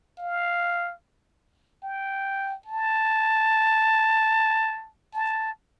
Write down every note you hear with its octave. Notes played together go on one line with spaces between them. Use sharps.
F5
G5
A5
A5